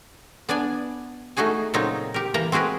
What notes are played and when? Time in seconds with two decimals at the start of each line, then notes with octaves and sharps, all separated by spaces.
0.49 B3 D4 D5 G#5
1.37 A3 D#4 F#4 G#4 G#5
1.74 A#2 C#3 F#3 C4 D#4
2.14 G4 A#4
2.34 E3 A#3 A#5
2.52 C4 F#4 G#4 A#4 B4